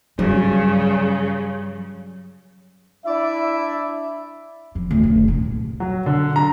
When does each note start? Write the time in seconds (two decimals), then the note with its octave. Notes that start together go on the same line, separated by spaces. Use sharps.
0.19 G2 C#3 F#3
3.05 D4 E4 D5 E5
4.75 F3
4.91 D2
5.03 D3
5.16 F1
5.28 A#2
5.80 F#3
6.06 D3
6.36 A#5